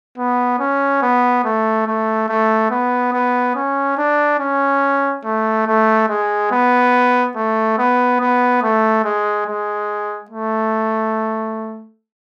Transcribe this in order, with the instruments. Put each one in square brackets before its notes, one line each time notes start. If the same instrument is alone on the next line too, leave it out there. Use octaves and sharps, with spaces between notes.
[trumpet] B3
C#4
B3
A3
A3
A3
B3
B3
C#4
D4
C#4
A3
A3
G#3
B3
A3
B3
B3
A3
G#3
G#3
A3